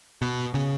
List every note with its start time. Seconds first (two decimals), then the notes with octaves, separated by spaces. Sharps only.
0.22 B2
0.54 C#3